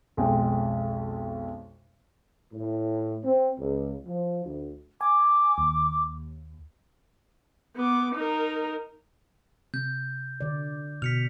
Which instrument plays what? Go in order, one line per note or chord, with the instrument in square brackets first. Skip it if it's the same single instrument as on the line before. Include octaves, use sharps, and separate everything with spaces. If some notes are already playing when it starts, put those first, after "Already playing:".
[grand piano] B1 F2 G#3 G5
[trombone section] A2
C4
C#2
F3
D2
[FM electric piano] G#5 [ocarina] D6
[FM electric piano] D#2
[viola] B3 D6
D#4 A#4
[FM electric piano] C3 [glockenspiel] G6
[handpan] D3 D5
[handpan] B2 [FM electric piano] F6 [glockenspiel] B6 C#7 F7